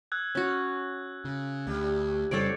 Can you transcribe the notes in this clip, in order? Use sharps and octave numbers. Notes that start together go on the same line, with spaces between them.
E6 F#6 G#6
C#4 F#4
C#3
D2 G3
F2 C#3 G3 C4 A4 C#5 D5